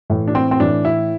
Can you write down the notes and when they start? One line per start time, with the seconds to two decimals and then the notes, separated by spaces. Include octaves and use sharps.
0.10 A2 E3
0.28 D4
0.35 C4
0.51 C4
0.60 A2 E3 D4
0.85 E4